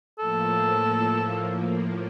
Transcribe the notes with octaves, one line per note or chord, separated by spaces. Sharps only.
A2 F3 A#3 A4